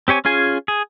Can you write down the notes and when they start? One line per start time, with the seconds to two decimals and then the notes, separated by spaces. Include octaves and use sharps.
0.08 C4 G4 C#5 G#5
0.25 C#4 F4 G#4 G#5
0.68 G#4